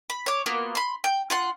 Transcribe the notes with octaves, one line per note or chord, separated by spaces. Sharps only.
B5
C#5 D6
A#3 B3 F4 F#4
B5 C6
G5
F4 F#5 C6